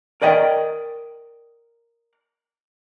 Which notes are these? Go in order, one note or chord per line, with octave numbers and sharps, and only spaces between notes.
A#4 D5 D#5 G5